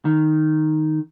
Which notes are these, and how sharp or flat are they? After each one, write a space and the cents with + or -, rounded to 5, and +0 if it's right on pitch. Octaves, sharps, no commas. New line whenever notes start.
D#3 -5